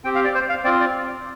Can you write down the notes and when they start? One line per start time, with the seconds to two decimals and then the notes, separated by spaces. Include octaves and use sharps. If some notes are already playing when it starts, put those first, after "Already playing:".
0.04 C4 G4 G5
0.15 F5
0.24 D5
0.34 C5
0.49 F5
0.64 C4 F4 D5
0.80 D5